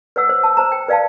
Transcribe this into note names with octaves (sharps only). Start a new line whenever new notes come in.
B4 C#5 F#5 E6
C5
A5 E6
C5 A5 A#5
G5
B4 D5 F5 G5 A5